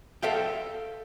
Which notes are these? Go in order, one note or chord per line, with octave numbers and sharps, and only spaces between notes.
A4 E5 F5 G5